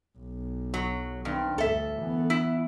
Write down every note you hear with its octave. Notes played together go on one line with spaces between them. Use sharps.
B1
F#3
G2 D#3 C4
D2 G2 A4 E5
E3 B3
E4